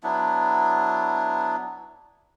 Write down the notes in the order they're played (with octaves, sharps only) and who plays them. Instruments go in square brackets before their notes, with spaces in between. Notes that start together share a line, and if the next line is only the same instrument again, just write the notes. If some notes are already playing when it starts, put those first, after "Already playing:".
[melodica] F#3 B3 D4 E4